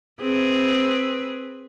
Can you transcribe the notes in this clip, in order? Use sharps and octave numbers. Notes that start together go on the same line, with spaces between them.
C4 G#4 B4